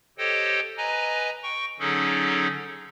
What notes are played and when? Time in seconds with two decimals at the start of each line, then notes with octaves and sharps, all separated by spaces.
0.18 G4 A4 C5 C#5 D#5 G5
0.77 B4 D#5 G#5 A#5
1.43 G5 C#6
1.79 D3 F#3 C#4 D#4 G#4 A4